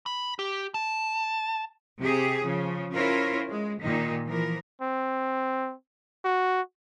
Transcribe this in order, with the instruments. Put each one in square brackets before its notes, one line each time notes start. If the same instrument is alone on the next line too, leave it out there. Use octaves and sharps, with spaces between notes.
[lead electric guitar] B5
G4
A5
[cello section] C3 G4 G#4
C#3 F3
C#4 E4 F4 A#4 C5
G#3
A#2 D#3 D#4
E3 F3 A#4
[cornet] C4
F#4